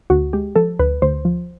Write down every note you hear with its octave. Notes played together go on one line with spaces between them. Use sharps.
D2 F#4
G#3 G4
F3 A4
D2 B4
D2 C5
F3